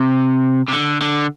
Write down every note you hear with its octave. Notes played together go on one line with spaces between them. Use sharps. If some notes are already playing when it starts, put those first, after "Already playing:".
Already playing: C3
C3
D3
D3